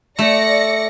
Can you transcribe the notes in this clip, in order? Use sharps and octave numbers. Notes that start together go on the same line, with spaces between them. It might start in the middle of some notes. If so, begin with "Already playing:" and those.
A3 D5 A#6 C#7